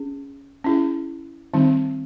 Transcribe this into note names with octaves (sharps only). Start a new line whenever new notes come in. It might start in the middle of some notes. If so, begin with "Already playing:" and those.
Already playing: C#4 G#4
C#4 E4 G#4
D#3 G3 C4 D#4